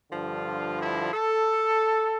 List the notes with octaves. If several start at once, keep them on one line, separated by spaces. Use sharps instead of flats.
G2 D3 F3 F4
E4
A4